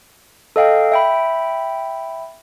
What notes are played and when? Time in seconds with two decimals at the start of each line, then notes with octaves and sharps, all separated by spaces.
0.56 A4 D#5 F5 G5
0.92 E5 G5 B5